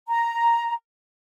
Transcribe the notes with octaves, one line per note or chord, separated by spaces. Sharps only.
A#5